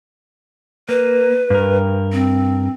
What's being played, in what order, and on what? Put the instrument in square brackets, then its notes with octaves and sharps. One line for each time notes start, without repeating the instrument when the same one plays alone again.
[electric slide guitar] A#3 [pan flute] B4
[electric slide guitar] G2 A#4
[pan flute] C4